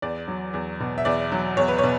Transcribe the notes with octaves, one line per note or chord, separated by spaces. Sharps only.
E2 D5
F#3
E2
B2
E5
E2 D5
F#3
E2 C#5
B4
C#5
B2